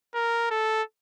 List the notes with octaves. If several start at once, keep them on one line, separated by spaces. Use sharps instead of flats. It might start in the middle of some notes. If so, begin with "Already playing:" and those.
A#4
A4